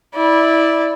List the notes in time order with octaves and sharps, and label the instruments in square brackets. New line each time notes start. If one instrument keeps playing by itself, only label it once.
[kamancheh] E4 D5